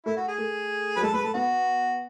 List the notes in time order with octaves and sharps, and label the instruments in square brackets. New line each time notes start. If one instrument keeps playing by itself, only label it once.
[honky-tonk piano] A3 [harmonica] E4
[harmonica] F#4
G#4
[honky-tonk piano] A3
[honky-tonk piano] F#3 [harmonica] B4
[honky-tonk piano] G#3 [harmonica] A4
[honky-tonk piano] G#3 [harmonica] B4
[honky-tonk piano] A3 [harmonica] A4
[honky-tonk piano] B3 [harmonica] F#4